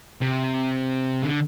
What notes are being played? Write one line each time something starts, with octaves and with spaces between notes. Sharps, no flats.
C3
D3